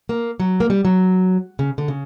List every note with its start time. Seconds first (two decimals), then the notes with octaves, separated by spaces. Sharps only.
0.09 A#3
0.40 F#3
0.60 A#3
0.70 G3
0.85 F#3
1.59 C#3
1.78 D3
1.88 C#3